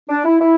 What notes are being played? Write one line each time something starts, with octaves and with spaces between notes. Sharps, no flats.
D4
E4
E4